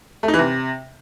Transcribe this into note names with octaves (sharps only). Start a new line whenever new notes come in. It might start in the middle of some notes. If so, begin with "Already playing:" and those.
A3
D#4
E3
C3